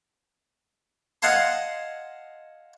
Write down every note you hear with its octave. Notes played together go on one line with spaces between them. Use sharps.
D#5 F5 F#5 G#5 A5 C6